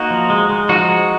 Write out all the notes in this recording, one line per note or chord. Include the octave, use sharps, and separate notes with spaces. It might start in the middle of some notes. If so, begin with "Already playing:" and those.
Already playing: A#3 D#4 F#4
F3
G#3
G#3
F3 D#4 F#4
G#3